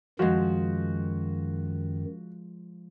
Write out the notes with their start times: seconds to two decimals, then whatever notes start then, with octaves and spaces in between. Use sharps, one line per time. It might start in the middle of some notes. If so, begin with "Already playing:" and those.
0.19 F#2 D#3 F3 G#3 F#4